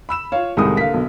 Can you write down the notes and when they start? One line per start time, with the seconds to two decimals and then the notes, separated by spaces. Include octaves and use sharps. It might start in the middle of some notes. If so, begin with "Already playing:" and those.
0.09 B5 E6 E7
0.32 F4 C#5 F5
0.57 C2 A2 D#3 G#3 D#6
0.77 D3 A#3 F5 B6
0.94 B1